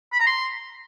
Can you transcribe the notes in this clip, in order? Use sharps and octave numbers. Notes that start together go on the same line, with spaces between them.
B5
A#5
C6